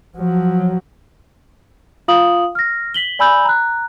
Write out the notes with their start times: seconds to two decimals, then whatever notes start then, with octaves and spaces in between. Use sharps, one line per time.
0.17 F3 F#3
2.08 F4 F5 D#6 F#7
2.55 F6 A#6
2.94 B6 F#7 G7
3.19 D5 G#5 B5 E6 G6 F#7
3.45 A#5 F#6